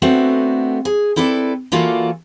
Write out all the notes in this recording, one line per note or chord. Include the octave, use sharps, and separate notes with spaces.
A3 B3 C4 D4 F#4 A4
G#4
C4 E4 A4 B4 D5
E3 A#3 F4 F#4 A4 D5